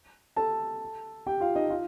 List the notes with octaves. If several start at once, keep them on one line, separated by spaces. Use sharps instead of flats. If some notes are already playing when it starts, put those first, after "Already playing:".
A4 A5
G4 G5
F4 F5
D#4 D#5
F4 F5